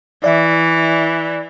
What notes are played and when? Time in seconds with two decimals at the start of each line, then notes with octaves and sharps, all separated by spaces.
0.24 E3 D5 E5